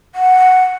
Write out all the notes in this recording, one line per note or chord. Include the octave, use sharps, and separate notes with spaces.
F#5